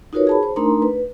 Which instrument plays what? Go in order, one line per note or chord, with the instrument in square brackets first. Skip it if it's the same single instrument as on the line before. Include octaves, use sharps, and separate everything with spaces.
[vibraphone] D#4 F4 F#4 A#4 B4 C#5
G#4 A5 B5
C5
A3 D4 D#4 A#4 A#5 C6
B4